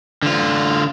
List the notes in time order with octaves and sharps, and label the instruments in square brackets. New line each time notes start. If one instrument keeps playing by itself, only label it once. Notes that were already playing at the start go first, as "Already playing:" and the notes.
[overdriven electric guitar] D3 F4